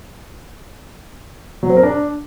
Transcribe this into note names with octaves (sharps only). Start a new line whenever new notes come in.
F#3
C4
A#4
D4